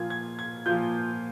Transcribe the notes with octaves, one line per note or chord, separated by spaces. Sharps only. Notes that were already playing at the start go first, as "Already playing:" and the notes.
Already playing: A#2 F3 A#3 F4 G#6
G#6
G#6
A#2 F3 A#3 F4 G6